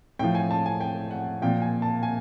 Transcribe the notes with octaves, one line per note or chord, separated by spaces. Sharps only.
A2 F3 G5
G#5
A5
G#5
G5
F#5
A#2 F3 G5
G#5
A5
G#5